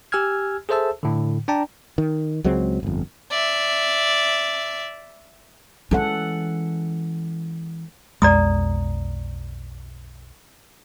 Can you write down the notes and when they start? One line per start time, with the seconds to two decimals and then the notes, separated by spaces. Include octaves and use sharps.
0.12 G4 G#5 E6 F6 G#6
0.69 G#4 A4 C5 E5 A5 E6
1.03 A2 D3
1.48 D4 D5 G5 A5 A#5
1.98 D#3
2.44 C#2 F#3 G#3 C4
2.83 G1 F2
3.31 D5 E5
5.91 E3 G#3 C#4 A4 F#5
8.22 B1 F2 G#3 D5 A#5 D#6